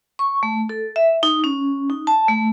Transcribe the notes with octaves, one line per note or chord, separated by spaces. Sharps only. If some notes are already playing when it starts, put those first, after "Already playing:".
C#6
A3
A4
E5
D#4
C#4
D#4
A5
A3